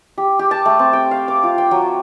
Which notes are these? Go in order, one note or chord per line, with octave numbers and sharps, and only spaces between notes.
G4
G4
A5
A3
C4
G5
F5
D6
F4
G5
F#3